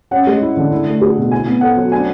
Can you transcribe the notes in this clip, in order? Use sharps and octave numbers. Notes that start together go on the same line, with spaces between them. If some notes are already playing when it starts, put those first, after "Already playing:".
C#4 F#5
G#3
E4
D3
E4
A3
G#4
B2
E4 G#5
B3
A4 F#5
F#3
D4 G#5